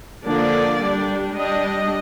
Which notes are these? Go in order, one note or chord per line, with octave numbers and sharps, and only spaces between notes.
D3 F3 A#3 D4 D5
G3 D4
G3 D4 D#5